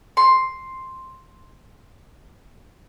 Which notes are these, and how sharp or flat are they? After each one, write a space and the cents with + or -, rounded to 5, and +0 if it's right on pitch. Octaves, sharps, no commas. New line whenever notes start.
C6 +5